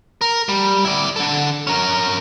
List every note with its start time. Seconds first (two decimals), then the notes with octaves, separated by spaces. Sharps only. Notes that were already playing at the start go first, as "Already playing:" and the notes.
0.21 A#4
0.49 G3
0.85 E4 D5
1.16 D3 A4
1.67 C#4 A#4